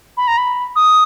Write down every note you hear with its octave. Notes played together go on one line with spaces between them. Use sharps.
B5
A#5
B5
D#6